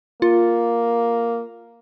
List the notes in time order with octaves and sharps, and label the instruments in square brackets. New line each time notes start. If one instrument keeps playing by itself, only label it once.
[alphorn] A#3 [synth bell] F4